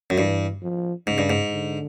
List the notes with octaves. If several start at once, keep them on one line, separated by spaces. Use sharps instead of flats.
F#2
G2 E3
F3
G#2 C#3
G2
G#2
D3